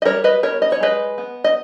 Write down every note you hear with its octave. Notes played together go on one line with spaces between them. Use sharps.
D#5
G3 A#4 C#5
B4 D#5
B3 A#4 C#5
D#5
C#5
G#3 B4 D#5
B3
D#5